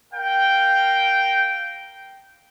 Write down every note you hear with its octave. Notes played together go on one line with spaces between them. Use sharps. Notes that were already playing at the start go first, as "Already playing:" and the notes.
A#4 F5 G5